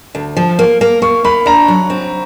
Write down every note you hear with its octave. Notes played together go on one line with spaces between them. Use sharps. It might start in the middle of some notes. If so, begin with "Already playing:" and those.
D2
F3
A#3
A#3
A#3 C#6
A#3 B5
D4 A#5
F#3
C4